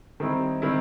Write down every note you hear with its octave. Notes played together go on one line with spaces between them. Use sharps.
D#3 G3 C4 E4
D#3 G3 C4 E4